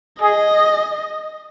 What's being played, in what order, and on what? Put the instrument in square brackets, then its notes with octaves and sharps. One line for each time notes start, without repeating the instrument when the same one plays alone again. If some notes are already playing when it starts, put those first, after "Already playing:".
[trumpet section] G#4 [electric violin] D#5